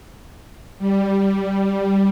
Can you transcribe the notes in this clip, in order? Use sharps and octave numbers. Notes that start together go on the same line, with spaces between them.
G3